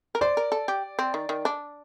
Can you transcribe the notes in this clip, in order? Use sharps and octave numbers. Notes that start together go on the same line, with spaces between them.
A#4
C5 D5
A#4
A4
G4
C4
D#3
D#3
D4